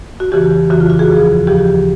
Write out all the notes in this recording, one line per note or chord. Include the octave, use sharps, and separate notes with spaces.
F#4
F2 C#3 E3 G4
F2 C#3 E3 F#4
F4
F#4
G#4
D#2 C#3 F3
D#2 C#3 F3 G4